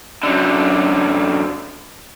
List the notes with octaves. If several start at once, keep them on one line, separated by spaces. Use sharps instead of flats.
F#2 D3